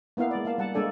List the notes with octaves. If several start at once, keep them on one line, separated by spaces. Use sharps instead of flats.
A#3 B3 E4 F5
G#3 D5
A#3 F5 A5
G3 F#5 A5
G#3 A#3 D4 A4 D5 G#5